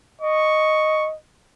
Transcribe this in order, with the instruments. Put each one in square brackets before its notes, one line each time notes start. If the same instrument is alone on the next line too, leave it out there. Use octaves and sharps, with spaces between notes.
[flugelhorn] D#5 [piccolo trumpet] C#6